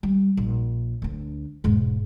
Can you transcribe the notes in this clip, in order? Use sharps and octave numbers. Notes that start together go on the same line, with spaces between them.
G3
A#1
D2 D4
E1 G#2